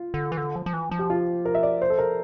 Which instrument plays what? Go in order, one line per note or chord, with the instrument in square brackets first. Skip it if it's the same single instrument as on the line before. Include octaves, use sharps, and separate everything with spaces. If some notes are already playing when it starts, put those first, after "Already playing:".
Already playing: [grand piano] F4
[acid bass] D3
E3
D3
F3
F3
E3
F3
[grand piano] G4
F4
A#4
E5
D5
C5
A4
A#4